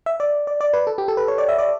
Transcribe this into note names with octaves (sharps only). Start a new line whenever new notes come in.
E5
D5
D5
D5
B4
A4
G4
A4
B4
C#5
D5
E5
D5